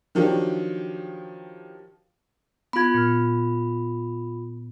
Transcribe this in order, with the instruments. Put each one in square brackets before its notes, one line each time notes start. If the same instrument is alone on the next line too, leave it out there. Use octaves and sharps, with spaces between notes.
[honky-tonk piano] D#3 F3 F#3 D4 G4
[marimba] B3 G#6 [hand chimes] F4 B5
[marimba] A#2 F6